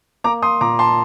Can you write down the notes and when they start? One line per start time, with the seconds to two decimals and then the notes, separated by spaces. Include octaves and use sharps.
0.24 A#3 A#5 D6
0.42 C6 D#6
0.61 A#2 A#5 D6
0.79 A5 C6